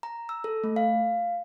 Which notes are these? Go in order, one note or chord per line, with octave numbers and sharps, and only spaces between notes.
A#5
E6
A4
A3
F5